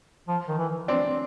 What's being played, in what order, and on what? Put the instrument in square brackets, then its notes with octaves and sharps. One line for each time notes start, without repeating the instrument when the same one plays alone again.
[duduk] F3
D#3
E3
[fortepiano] C4 D4